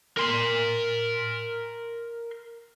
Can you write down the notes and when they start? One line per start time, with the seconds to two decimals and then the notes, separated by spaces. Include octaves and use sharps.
0.17 A#4 C6